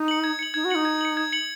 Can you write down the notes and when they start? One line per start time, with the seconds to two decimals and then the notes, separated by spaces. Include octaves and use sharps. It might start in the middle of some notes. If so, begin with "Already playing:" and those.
Already playing: D#4
0.08 C#7 F#7
0.24 G#6
0.39 C#7 F#7
0.54 D#4 G#6
0.64 F#4
0.70 D#4 C#7 F#7
0.85 G#6
1.01 C#7 F#7
1.17 G#6
1.32 C#7 F#7